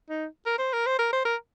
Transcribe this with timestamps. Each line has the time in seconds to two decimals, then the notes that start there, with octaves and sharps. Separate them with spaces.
0.09 D#4
0.46 A#4
0.58 C5
0.73 A#4
0.86 C5
0.99 A#4
1.13 C5
1.25 A#4